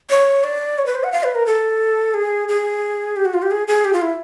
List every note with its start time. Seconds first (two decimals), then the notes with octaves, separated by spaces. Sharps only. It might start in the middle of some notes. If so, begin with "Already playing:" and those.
0.10 C#5
0.44 D5
0.78 C#5
0.86 B4
0.95 C5
1.04 F#5
1.12 F5
1.24 B4
1.35 A#4
1.46 A4
2.14 G#4
2.49 G#4
3.16 G4
3.25 F#4
3.34 F4
3.42 G4
3.51 G#4
3.68 G#4
3.85 G4
3.93 F4
4.02 E4